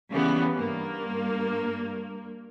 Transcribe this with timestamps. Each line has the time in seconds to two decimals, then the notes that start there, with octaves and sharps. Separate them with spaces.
0.10 C#3 E3 G3 B3
0.57 G2 A#3